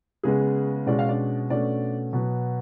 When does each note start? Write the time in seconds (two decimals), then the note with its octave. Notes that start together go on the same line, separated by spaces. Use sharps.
0.23 C#3 G#3 B3 G#4
0.87 B2 G#3 C#4 D5
0.99 F5
1.09 D4 D5
1.50 B2 A3 C#4 D4 D5
2.13 B2 F#3 B3 B4